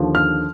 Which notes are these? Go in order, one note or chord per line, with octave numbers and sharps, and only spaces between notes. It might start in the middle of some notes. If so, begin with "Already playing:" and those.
Already playing: D#2 D3 F3
F6